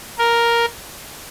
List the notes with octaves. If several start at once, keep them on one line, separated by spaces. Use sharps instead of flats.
A#4